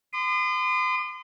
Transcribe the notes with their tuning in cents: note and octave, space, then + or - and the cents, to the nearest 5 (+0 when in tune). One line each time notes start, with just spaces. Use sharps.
C6 -40 D#6 -40